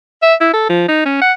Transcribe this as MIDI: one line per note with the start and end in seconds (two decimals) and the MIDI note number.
0.22 0.35 76
0.41 0.51 64
0.53 0.67 69
0.69 0.87 53
0.89 1.03 63
1.06 1.21 61
1.21 1.33 78